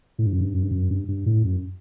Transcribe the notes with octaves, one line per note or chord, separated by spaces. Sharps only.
A2
G2
F#2
G2
F#2
G2
F#2
G2
G2
A2
F#2